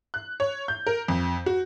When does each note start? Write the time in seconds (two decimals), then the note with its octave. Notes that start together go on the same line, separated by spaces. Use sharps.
0.14 F#6
0.40 C#5
0.68 G6
0.87 A#4
1.08 F2
1.46 F#4